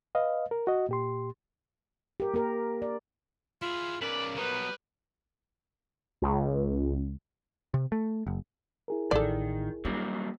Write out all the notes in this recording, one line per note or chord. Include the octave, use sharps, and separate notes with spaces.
B4 D#5 F5
A#4
F#4 D#5
A#2 G4 C6
G4 A#4
A#3 G4 A#4
D5
E4 F4 G#4
C#3 A#4 B4 D5
F#3 G3 B3 B4
C#2
C3
A3
F#1
E4 G#4 A#4
A1 D#3 A4 D5
F#3 G3 A#3 D4